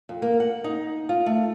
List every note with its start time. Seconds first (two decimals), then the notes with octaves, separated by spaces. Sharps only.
0.09 F2
0.22 A#3
0.40 F#5
0.64 D#4
1.09 F4
1.26 A3